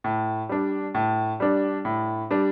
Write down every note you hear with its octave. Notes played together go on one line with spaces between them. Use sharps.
A2
G3 D4
A2
G3 D4
A2
G3 D4